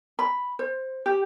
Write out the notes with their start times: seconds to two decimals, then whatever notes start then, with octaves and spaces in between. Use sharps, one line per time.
0.19 B5
0.59 C5
1.06 G4